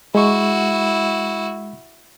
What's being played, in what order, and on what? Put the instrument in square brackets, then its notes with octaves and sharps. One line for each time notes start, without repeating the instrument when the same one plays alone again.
[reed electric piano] G#3 C#6 [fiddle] E4 F#4